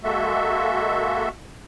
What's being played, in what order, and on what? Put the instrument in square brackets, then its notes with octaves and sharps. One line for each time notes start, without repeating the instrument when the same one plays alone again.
[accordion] G#3 A#3 F#4 A4 E5